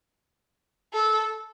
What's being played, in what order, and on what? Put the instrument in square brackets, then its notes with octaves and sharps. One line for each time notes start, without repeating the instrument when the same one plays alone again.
[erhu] A4